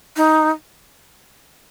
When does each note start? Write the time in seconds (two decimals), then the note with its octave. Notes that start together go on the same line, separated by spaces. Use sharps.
0.17 D#4